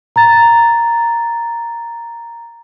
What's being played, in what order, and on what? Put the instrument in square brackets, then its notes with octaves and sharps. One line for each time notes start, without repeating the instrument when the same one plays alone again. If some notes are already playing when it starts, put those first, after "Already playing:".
[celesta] A#5 A6